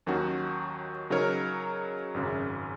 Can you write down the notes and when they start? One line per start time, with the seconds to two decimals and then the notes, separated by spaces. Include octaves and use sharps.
0.06 D#2 D#3 F#3 C#4 F#4
1.10 C#3 F#3 D#4 A#4 C#5
2.14 G#1 F#2 C#3